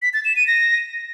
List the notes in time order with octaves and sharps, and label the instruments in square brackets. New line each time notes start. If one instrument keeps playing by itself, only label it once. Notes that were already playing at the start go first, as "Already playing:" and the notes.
[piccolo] B6
A6
E7
D#7
A#6